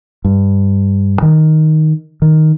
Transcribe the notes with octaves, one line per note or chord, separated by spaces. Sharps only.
G2
D#3
D#3